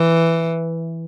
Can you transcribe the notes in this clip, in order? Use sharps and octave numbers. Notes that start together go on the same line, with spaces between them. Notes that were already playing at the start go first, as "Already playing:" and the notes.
Already playing: E3